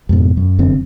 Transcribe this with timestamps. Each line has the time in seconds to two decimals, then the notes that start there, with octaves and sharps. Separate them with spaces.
0.09 F2 G#2 B2
0.37 F#2
0.58 F1 F#2 D3 C4